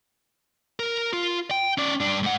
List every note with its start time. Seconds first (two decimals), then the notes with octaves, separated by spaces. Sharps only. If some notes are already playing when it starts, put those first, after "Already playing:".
0.80 A#4
1.13 F4
1.51 G5
1.78 C#4 D5
2.00 G2 D4
2.23 G#2 F#5